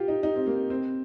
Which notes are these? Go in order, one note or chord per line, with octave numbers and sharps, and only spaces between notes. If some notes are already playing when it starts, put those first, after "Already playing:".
Already playing: F4 G4
D#4
D#4
C4
A#3
C4